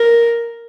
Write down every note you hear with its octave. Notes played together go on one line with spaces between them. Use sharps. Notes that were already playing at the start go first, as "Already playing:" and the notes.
Already playing: A#4